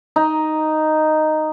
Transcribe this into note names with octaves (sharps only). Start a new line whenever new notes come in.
D#4